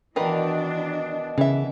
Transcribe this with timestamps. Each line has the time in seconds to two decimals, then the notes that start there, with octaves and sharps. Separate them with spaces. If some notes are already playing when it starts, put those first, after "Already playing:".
0.16 B2 D#3 E3 D4 F4 A#4 B4
1.38 C#3 E3 E5